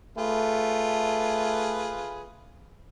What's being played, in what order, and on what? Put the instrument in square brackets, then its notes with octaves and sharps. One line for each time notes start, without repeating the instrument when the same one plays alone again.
[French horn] A3 [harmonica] F4 G#4 B4